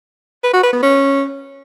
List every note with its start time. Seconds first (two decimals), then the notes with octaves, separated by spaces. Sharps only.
0.44 B4
0.53 F#4
0.63 B4
0.73 B3
0.83 C#4